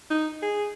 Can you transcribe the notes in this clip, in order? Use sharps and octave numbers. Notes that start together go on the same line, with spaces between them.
D#4
G#4